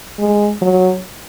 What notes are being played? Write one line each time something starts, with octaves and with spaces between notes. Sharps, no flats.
G#3
F#3